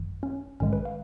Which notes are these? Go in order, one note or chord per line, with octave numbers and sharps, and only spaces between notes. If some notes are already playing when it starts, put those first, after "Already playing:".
Already playing: G#1 F#2 D#3
C#4
A#1 G#2 D#3 G#3 C#4
B4
F5